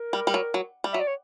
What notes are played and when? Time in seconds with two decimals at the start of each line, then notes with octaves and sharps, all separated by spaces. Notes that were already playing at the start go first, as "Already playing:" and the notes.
Already playing: A#4
0.13 G3
0.27 G3
0.34 F#3
0.54 F#3
0.84 G3
0.93 F#3 E5
1.00 D5
1.07 C#5